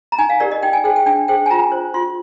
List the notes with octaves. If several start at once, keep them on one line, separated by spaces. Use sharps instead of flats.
A#5
D#4 G#5
F5
G4 A#4 D5
D#5
D#4 G5
G#5
G#4 C5 G5
G5
D4 G5
G#4 C5 G5
G#5
F4 A#5
C5
F4 C6